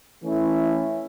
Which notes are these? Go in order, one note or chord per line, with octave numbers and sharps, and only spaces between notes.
E3 A3 C#4 E4